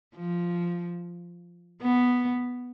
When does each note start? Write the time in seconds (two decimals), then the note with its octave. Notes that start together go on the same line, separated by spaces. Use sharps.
0.15 F3
1.82 B3